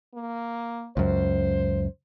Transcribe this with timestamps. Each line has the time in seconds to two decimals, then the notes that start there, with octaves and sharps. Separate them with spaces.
0.15 A#3
0.97 C#2 F#2 C5